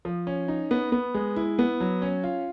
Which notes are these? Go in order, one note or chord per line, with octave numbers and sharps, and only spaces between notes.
F3
C#4
D#4
B3
B3
G#3
E4
B3
F#3
C#4
F4